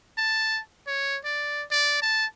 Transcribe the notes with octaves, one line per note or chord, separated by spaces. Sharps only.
A5
C#5
D5
D5
A5